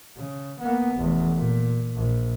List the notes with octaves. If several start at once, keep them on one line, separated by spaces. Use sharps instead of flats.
C#3
A#3 B3
F1 E2
A#2
A#1